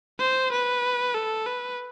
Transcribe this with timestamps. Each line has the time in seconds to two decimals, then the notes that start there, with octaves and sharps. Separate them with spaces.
0.20 C5
0.52 B4
1.15 A4
1.46 B4